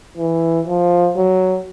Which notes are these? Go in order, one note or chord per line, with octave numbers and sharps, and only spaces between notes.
E3
F3
F#3